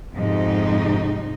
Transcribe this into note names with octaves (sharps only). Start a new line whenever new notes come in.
F2 G#2 C3 G#3 D#4